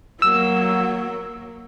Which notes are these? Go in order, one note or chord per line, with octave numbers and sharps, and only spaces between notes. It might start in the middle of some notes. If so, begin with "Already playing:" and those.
F#3 A#3 E6